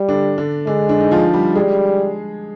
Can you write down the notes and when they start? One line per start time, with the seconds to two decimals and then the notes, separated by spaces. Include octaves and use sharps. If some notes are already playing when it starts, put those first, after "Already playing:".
Already playing: G3
0.08 D3 D4
0.38 D3 D4
0.67 D3 G#3 D4
0.89 D3 D4
1.00 D#4
1.11 F3 F4
1.33 G3 G4
1.56 G3 G#3 G#4